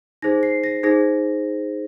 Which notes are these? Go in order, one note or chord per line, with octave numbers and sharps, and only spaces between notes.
D#4 G#4 C5 A#6
C7
A#6
D#4 G#4 C5 A#6